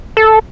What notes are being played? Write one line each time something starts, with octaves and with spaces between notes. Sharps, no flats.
A4